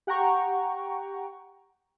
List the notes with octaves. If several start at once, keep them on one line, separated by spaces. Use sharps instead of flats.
G4 F#5 G5 A#5 C#6